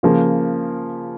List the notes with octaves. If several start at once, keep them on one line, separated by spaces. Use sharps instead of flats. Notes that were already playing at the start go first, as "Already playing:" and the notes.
C#3 F3 A#3